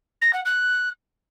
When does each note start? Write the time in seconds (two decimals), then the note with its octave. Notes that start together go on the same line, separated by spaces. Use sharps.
0.21 A#6
0.33 F#5
0.45 F#6